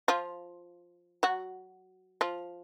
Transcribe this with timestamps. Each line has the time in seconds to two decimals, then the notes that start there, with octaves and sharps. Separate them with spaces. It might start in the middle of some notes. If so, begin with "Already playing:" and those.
0.08 F3 F4
1.23 F#3 F#4
2.21 F3 F4